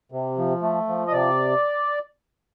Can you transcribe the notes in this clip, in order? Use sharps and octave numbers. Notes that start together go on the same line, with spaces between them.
C3
F3
A3
F3
D#5
C3 D5